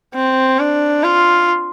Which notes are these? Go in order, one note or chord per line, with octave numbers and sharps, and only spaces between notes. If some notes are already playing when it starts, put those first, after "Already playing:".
C4
D4
F4